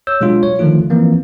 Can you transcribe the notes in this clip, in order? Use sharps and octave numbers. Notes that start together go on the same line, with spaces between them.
C#5 E6 G6
B2 F#3 G#3 D4 F4
C#5
D3 D#3 F3 A3 F4
E3 F3 A#3 C4